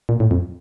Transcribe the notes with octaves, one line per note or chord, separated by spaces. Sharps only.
A#2
A2
F2